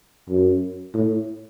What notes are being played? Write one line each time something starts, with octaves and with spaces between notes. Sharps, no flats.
F#2
A2